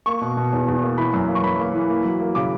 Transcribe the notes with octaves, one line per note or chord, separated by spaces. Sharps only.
A#3 C#6
B2
B2
E2
E2
A#3
E3 B5
F#2
A#3
C#6
F#2 B5
A#3
E3
A#3
F#3
A#3
C#3 D6